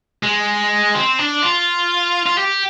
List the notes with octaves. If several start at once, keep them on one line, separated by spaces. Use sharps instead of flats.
G#3
C4
D4
F4
F4
G4